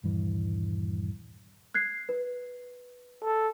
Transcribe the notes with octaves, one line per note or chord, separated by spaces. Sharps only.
D#1 G2 E3
F#6 G#6 C7
B4
A4